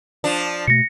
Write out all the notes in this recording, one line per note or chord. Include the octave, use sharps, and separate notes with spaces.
F3 D4
B2 A3 A#6 C#7